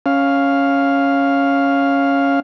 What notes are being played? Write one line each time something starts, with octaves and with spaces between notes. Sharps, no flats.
C#4 F5